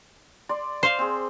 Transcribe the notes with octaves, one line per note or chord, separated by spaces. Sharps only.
D5 C6
C5 F5 C6
C4 G#4